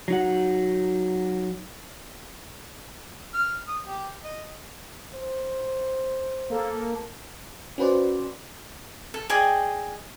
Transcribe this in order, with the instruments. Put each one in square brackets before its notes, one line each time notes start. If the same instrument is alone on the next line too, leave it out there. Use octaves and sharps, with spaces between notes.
[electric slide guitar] F#3 D#4 F#5
[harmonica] F6
D#6
G4
D#5
[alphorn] C5
[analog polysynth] A#3 A4
[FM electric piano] C#4 F#4 B4 C5 D5
[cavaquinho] A4
G#4 D5 D#5 G5